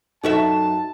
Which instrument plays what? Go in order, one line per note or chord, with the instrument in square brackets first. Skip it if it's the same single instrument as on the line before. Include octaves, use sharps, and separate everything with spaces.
[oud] F#2 F#4 E5 [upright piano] D#4 A4 [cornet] A5